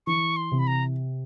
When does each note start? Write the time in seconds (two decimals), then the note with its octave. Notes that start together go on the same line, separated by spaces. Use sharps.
0.07 E3 C#6
0.36 C6
0.52 C3
0.59 B5
0.67 A#5